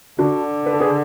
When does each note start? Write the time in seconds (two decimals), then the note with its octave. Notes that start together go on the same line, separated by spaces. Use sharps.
0.19 D3 D4 F#4
0.66 B4
0.73 A4
0.80 G#4 B4